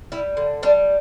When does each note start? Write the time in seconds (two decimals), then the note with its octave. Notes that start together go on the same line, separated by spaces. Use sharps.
0.12 G3 E4
0.37 D3
0.63 G3 D4